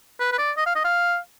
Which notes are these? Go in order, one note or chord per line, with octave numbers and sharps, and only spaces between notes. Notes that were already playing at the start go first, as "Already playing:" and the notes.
B4
B4
D5
D#5
F5
D#5
F5